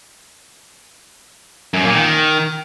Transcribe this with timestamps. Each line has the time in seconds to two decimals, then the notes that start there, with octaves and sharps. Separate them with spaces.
1.74 F#2
1.84 A#2
1.95 D#3